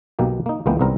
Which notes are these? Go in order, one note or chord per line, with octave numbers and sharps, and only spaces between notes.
B1 B2 A#3 G4
A#3 D#4
C#2 E3 G#3 A#3 B3 G5
C2 G#2 G3 B3 C4 A#4